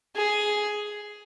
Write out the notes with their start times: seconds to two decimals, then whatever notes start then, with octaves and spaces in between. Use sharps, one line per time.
0.16 G#4